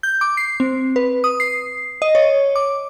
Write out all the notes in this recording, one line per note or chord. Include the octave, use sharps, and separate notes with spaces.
G6
D6
C7
C4
B4
D#6
C7
D#5
C#5
D6